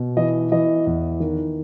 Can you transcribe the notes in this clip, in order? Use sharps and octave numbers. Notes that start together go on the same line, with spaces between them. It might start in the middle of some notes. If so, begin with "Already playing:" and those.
Already playing: B2
E3 D#5
E3 D#5
E2
D#3